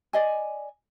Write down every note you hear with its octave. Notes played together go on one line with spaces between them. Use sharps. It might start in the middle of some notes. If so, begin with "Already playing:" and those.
D5 D#5 G#5